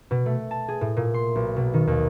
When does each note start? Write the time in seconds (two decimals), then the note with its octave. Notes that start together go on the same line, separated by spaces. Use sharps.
0.11 B2
0.26 A3
0.51 A5
0.68 G#4
0.81 A2
0.97 A#2
1.14 C6
1.35 B1
1.56 B2
1.74 D#3
1.87 D#2